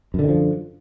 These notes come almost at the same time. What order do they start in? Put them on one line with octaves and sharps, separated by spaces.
F#2 D3 D#3 F3